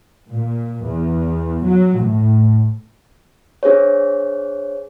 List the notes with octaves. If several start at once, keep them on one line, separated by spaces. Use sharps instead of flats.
A#2
E2
F#3
A2
D4 G#4 C5 C#5